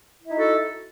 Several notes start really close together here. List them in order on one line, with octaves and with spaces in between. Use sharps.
E4 E5 D#4 F#4 A4